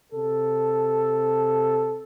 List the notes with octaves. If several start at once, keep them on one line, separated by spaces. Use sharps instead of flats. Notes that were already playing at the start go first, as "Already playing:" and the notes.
C3 A4